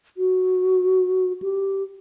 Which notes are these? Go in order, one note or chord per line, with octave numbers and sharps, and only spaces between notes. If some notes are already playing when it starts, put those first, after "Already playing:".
F#4
G4